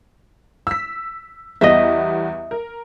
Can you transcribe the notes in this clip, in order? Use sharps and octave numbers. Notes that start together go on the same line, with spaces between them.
E6 B6
E2 G3 B3 D#5 E5
A#4